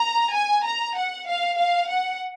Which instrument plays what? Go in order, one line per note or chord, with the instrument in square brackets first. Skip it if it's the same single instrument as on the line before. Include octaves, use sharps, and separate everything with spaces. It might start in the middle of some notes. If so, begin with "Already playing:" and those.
Already playing: [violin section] A#5
G#5
A#5
F#5
F5
F5
F#5